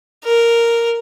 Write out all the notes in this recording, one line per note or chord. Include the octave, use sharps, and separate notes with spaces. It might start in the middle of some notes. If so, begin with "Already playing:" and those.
A#4